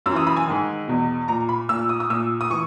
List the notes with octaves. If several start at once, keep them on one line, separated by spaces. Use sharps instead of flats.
F#2 E6
E3
D#6
B5
G#5
G#2 D#3
E2 B2
A#2 A#5
B5
A#2 E6
D#6
D#6
A#2 E6
D#6
E3 C#6